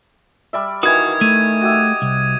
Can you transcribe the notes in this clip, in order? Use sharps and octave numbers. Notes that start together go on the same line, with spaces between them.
G3 D5 E5
D#3 E3 F#4 B4 D#6 G#6
A3 D#7
F#4 G4 E5
C2